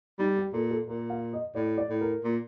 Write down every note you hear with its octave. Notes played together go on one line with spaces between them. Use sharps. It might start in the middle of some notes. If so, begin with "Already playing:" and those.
G3 D#4
G4
A#2 A4
A4
A#2 A#4
F5
D#5
A2 D5
D5
A2
A#4
A#2